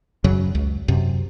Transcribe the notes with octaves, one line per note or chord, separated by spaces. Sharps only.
F#2 C#3 F#3
C#2
F#2 C3